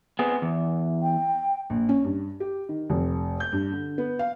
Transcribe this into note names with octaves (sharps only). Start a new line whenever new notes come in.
B3 C4 G#4
E2
G5
A#1
C#4
G2
G4
D#3
F1
G6
G2
D3
B3
F5